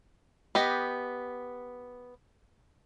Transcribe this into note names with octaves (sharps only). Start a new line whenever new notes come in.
B3 G4 D#5